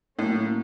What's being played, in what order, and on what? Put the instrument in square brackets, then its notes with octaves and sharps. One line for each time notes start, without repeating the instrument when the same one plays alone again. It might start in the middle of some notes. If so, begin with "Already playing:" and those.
[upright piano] A2 [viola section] F#3 A#3 C#4